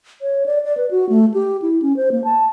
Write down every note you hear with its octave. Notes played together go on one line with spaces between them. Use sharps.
C#5
D5
D5
B4
F#4
A3
G4
E4
C#4
C5
A#3
A5